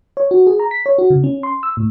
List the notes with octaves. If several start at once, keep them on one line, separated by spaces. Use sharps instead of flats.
C#5
F#4
G#4
A#5
B6
C#5
F#4
C#3
C#4
C6
E6
A2